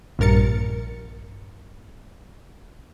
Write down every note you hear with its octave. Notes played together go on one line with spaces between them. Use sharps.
A#1 G2 A#4 A6 C#7